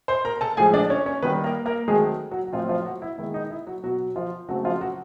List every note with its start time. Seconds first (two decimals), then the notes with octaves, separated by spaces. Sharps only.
0.08 C5 C6
0.25 A#4 A#5
0.41 A4 A5
0.57 A2 F3 G#3 G#4 G#5
0.74 D4 D5
0.90 C#4 C#5
1.06 C#4 C#5
1.23 D#3 G3 A#3 B3 B4
1.44 A#3 A#4
1.66 A#3 A#4
1.88 D#3 F#3 G#3 A3 C4 G#4
2.31 F#3 F#4
2.46 F#4
2.53 A2 F3 F#3 A3 C4 F4
2.69 F3 F4
2.85 F#3 F#4
3.02 E4
3.18 D#3 G#3 B3 E4
3.34 D#4
3.51 E4
3.67 F#3 F#4
3.83 B2 F#3 B3 F#4
4.16 F3 F4
4.48 C#3 F#3 A3 C4 F#4
4.65 F3 F4
4.81 F#3 F#4